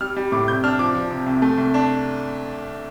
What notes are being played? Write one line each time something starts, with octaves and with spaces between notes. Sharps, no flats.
G3 F6
G3
A2 D6
C3 G6
D4 F6
F3 D6
F3
C3
C2
A3
C2
D4